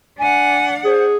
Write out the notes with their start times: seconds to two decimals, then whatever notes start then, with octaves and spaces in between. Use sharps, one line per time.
0.19 D4 F#5 G#5
0.85 G#4 C5